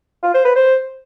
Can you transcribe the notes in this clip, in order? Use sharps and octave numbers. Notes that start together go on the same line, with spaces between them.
F4
C5
B4
C5